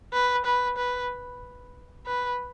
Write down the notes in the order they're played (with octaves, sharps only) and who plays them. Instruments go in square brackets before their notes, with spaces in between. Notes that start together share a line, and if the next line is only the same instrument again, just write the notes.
[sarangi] B4
B4
B4
B4